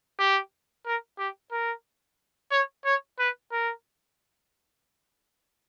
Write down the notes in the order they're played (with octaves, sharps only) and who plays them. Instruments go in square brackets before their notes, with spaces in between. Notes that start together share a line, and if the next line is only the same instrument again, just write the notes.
[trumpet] G4
A#4
G4
A#4
C#5
C#5
B4
A#4